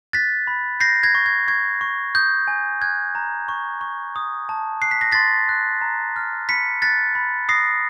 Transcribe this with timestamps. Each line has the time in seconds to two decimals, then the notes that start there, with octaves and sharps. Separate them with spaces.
0.13 F#6 A6 B6
0.47 B5
0.80 G6 A#6 C7
1.03 G#6 A#6
1.15 C#6
1.26 G#6
1.48 C#6 G#6
1.81 C#6
2.15 D#6 G6
2.48 G#5
2.81 F#6 G#6
3.15 A#5
3.49 C#6
3.81 C#6
4.16 D#6
4.49 A5
4.81 F#6 C7
4.91 B6
5.01 A#6
5.12 C6 A6 B6
5.49 F#6
5.82 A#5
6.16 F6
6.49 B5 B6 C#7
6.82 F#6 A6 B6
7.15 B5
7.49 D#6 A#6 C7